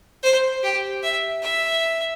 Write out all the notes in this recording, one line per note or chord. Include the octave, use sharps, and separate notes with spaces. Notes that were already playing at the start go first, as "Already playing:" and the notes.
C5
G4
E5
E5